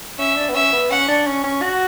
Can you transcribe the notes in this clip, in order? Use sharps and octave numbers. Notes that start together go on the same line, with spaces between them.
C#4 E5
D4
B3
C#4 E5
B3
C#4 F#5
D4
C#4
C#4
F#4